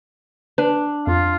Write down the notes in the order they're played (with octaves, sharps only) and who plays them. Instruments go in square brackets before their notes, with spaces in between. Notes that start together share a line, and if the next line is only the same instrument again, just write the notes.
[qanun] D4 [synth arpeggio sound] B4
[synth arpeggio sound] F2 [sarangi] F4